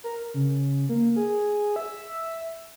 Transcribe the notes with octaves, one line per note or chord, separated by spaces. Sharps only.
A#4
C#3
A#3
G#4
E5